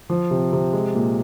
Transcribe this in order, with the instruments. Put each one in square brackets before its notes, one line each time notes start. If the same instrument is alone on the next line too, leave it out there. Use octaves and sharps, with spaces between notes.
[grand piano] F3
C3
C3
G#3
A#2